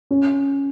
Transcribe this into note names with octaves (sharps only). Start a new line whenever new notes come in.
C#4